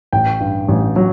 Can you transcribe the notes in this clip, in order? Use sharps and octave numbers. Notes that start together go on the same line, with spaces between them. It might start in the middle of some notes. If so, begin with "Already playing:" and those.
A1 G5
G2
A1
F#3